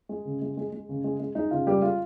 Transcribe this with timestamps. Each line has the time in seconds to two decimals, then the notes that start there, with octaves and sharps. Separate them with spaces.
0.09 G#3
0.25 C#3
0.42 G#3
0.57 G#3
0.72 G#3
0.89 C#3
1.04 G#3
1.20 G#3
1.35 G#3 D#4
1.51 C#3 F4
1.67 G3 G#3 G4
1.82 G#3 F4